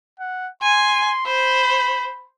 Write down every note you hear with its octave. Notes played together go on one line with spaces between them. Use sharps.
F#5
G#5 C6
C5 B5